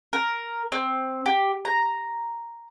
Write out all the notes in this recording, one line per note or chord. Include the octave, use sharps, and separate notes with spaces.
A#4
C4
G4
A#5